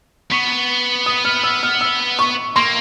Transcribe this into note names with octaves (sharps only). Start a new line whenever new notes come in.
B3 C#6
D#6
F6
E6
F6
E6
C#6
A#3 C6